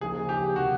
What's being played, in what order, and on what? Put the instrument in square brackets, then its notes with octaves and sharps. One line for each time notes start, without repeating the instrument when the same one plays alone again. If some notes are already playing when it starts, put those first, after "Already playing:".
[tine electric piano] C#3 F3 A#3 D#4 [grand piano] G#4
[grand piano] G4
[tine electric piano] C3 D#3 [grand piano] F#4